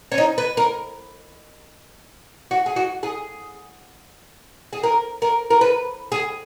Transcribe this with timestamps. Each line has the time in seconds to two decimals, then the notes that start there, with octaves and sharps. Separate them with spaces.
0.12 C#4
0.18 D#4
0.38 B4
0.57 A#4
2.51 F#4
2.66 G#4
2.76 F#4
3.03 G#4
4.73 G#4
4.83 A#4
5.22 A#4
5.50 A#4
5.61 B4
6.12 G#4